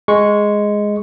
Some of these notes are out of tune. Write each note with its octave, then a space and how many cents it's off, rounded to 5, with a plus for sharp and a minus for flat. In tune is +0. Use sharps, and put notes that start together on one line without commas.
G#3 +0 C#6 +0